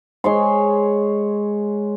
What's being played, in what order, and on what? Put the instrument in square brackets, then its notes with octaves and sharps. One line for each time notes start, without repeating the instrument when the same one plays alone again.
[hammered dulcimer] G#3 C#5 C6